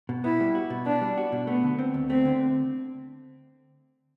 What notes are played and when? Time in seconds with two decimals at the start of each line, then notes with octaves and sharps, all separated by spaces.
0.09 B2
0.24 B3 E4
0.40 G3
0.55 F#4
0.70 B2
0.86 B3 D4
1.01 G3
1.18 F#4
1.32 B2
1.47 A3 B3
1.63 D3
1.79 C4
1.94 D2
2.09 A3 C4
2.25 D3